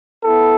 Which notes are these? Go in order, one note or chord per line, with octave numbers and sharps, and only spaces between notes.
B3 E4 A4